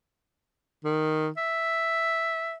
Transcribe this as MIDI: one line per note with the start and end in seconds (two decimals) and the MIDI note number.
0.84 1.28 51
1.37 2.55 76